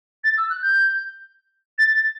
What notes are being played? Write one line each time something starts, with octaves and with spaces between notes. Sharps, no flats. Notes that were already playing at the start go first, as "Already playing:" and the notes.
A6
E6
F#6
G6
A6
A6